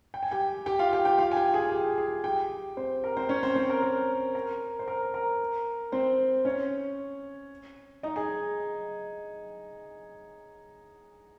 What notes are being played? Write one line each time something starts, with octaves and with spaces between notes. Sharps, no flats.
G5
G#5
G4 G5
G4 G5
F4 F5
G4 G5
G4 G5
F4 F5
G#5
G4 G5
G#4 G#5
G#5
G4 G5
G#4 G#5
G4 G5
C4 C5
A#4
C4 C5
C#4 C#5
C4 C5
C4 C5
A#4
A#4
A#4
C5
A#4
A#4
C4 C5
C#4 C#5
D#4 D#5
G#4 G#5